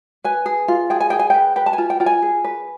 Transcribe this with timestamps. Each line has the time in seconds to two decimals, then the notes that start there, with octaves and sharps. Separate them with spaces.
0.24 B4 G#5
0.46 G#4
0.68 F4
0.90 G#4 G5
1.00 G#5
1.10 G#4 G5
1.19 G#5
1.30 B4 G5
1.56 B4 G5
1.66 A5
1.73 G#5
1.78 F4
1.90 G5
2.00 F4 G5
2.06 G#5
2.22 G#4
2.44 B4